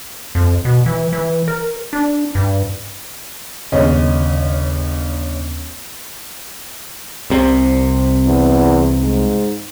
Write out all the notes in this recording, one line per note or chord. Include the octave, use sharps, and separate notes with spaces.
F2
B2
E3
E3
A#4
D4
G2
G1 D#2 C#3 C#4 D#5
C2 C3
E2
G#2